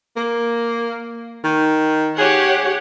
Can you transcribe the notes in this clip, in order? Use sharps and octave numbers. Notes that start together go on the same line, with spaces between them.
A#3
D#3
G4 G#4 C#5 F#5